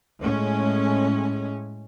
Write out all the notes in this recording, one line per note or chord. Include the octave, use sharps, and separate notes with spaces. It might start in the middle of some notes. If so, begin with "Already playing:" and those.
A2 G#3 C#4